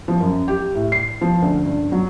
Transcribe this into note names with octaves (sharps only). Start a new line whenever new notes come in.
F3
F#2
G4
A2
C7
F3
D2
G2
F#3